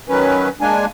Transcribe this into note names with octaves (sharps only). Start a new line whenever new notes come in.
D#3 F#3 C#4 B4
G#3 A#3 D4 G#5